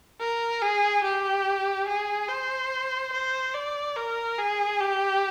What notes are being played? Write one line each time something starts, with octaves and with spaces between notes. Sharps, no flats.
A#4
G#4
G4
G#4
C5
C5
D5
A#4
G#4
G4